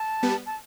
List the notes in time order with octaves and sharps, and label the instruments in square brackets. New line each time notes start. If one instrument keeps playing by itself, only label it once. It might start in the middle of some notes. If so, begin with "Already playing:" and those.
Already playing: [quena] A5
[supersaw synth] G3 B3
[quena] A5